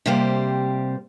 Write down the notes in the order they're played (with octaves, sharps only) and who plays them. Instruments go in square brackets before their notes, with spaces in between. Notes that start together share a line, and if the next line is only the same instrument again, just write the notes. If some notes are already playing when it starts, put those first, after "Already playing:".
[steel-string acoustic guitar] C3 G3 A#3 G4 C5